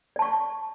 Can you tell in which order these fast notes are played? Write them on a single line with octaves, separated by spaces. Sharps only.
D5 A5 C#6